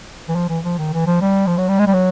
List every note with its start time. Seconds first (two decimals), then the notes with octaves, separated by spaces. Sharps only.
0.29 E3
0.35 F3
0.49 E3
0.64 F3
0.78 D#3
0.93 E3
1.07 F3
1.22 G3
1.47 F3
1.58 F#3
1.68 G3
1.79 G#3
1.87 G3
1.94 F#3